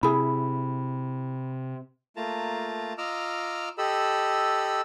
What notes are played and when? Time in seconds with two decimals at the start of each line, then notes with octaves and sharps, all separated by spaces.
0.03 C3 E4 G#4 B5
2.16 A3 A#3 F4 A5 A#5
2.98 F4 D#5 A#5 D6 E6 F6
3.78 G4 A4 D#5 B5 E6